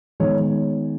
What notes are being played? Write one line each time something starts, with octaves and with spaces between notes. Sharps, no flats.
D#3 G#3 B3 C#5